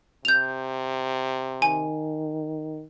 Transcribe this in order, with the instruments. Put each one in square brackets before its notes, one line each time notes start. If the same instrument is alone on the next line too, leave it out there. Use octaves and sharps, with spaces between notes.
[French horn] C3 [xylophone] G6 F7
[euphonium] D#3 [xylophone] G#5